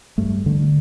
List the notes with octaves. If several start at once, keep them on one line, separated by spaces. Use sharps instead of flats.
G2 A3
D3